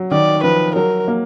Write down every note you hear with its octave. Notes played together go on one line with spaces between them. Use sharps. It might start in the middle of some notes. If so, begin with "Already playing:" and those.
Already playing: F#3
D#3 D5
F3 B4
F#3 A#4
A#3